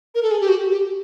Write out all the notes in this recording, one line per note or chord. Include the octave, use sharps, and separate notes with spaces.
A#4
A4
G#4
G4
F#4
G4